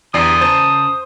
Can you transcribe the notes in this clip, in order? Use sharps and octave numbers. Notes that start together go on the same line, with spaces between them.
E2 D3 G4 D5 A#5 D#6 C7
C#3 C5 A5 A#5